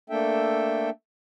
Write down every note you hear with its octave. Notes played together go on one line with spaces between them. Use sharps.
A3 A#3 D4 A4 E5 G5